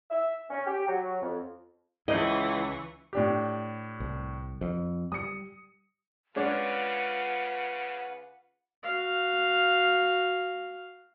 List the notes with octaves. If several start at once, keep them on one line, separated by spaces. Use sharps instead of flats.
E5
C#4
G4
F#3
F2
C#2 E3 E4 D#5 C#6
A2 D4 G4
C2
F2
G3 D#6 C#7
C#3 G#3 C#4 D4 F4 B4 F#5
F#4 F5